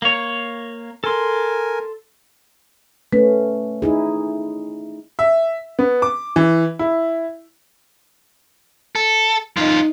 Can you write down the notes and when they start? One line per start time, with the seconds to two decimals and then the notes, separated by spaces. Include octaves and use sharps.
0.02 A#3 C#5
1.04 A4 A#4 G#5 C6
3.13 A3 C#4 B4
3.82 D#4 E4 G#4
5.19 E5
5.79 B3
6.02 D6
6.36 E3
6.79 E4
8.96 A4
9.57 F#2 D#4 F4 D#5